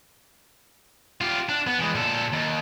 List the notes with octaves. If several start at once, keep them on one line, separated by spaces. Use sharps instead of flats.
F4 G4
D4
B3
E3 G#3
A#2 A4
D#2